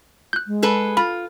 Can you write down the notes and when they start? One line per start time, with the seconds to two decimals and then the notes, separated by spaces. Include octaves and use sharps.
0.33 F#6 G6
0.47 G#3
0.62 G#4 A4 B4
0.97 F4 B5